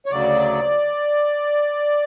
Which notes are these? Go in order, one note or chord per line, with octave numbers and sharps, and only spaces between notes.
C#5
D2 C#3 F#3 D5